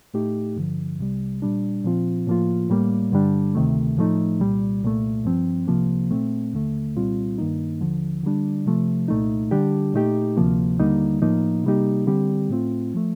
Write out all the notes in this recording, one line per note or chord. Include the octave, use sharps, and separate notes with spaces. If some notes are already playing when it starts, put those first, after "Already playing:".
A2 A3 D#4 G4
G2 D3 F3
C2 C3 G3
A#2 G3 D4
A#2 F3 C4 F4
A2 F3 A#3 F4
A2 G3 A#3
G2 D3 G3 D4
D2 C3 D#3 A3
A2 F3 A3 D#4
C2 A#2 G3
C2 A#2 A3
G2 F3 C4
C2 C3 F3 A#3
A#2 A3 C4
D#2 D3 A3
C2 A#2 G3 C4 F4
G2 D#3 A#3 D#4
D#2 D3 F3
D3 G3 D4
C3 F3 A3
C2 A#2 A3 D#4
D3 G3 D4 G4
A#2 A3 D#4 G4
D2 C3 F3 A#3
D#2 D3 G3 A#3 D#4
A2 F3 A#3 D#4
C3 G3 A#3 D#4 G4
D3 G3 C4 G4
A2 A3 C4 F4
F3 A3